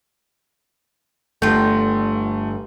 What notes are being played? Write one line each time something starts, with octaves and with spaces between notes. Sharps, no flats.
G1 G2 A3 F4 G5